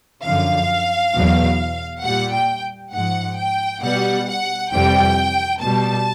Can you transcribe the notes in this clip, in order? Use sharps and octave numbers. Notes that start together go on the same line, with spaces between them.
F#2 D3 F3 F5
E2 B2 F#3
A#2 G3 F#5
G5
G#2 F3 F#5
G5
B2 G3 F#5
F#5
F2 C3 E3 G3 G5
B2 G3 A5